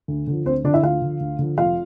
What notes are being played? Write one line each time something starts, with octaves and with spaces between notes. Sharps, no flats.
D2
D3 F3
D2 C4 C5
D3 F3 D4 D5
E4 E5
D2 F4 F5
D3 F3
D2
D3 F3
F1 F4 F5